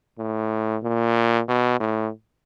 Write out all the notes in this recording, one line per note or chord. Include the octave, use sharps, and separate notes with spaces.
A2
A#2
B2
A2